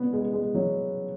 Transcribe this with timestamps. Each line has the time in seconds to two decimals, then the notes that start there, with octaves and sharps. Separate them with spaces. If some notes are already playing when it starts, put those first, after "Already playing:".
Already playing: B3
0.13 G#3
0.33 G#3
0.55 F#3